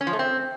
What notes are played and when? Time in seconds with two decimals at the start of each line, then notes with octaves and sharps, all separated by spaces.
0.01 C#4
0.07 F3
0.13 A3
0.19 C4